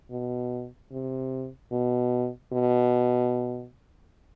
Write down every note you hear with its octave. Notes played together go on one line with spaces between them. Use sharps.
B2
C3
B2
B2